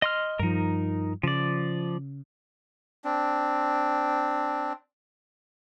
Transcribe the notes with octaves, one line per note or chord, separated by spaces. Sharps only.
D#5 C6 F6
G2 F3 D#4 A#4
C#3 F3 D5
C4 D4